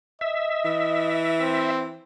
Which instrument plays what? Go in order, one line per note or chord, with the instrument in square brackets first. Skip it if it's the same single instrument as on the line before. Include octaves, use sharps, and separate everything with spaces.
[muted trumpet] D#5 [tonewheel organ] E5
[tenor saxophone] E3
[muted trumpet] C4